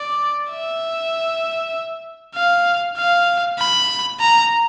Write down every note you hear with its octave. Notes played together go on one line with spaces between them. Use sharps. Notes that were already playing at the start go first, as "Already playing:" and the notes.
Already playing: D5
E5
F5
F5
B5
A#5